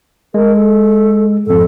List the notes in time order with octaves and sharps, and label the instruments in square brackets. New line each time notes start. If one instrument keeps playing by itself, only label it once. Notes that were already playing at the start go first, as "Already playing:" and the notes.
[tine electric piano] G#3 [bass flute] A#4
[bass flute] A4
[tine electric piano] F2 G#2 [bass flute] A4